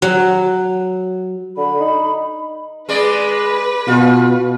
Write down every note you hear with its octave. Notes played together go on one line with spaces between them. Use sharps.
F#3
D3 B5
D#4
G#3 G#4 B4 D5
B2 F4